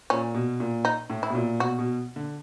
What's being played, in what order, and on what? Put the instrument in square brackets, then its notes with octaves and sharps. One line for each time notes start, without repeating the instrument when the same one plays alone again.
[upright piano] A#2 [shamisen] C#4
[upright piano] B2
A#2
[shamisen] D#4
[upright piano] A2
[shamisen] E4
[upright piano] B2
A#2
[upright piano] B2 [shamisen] F#4
[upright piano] B2
D3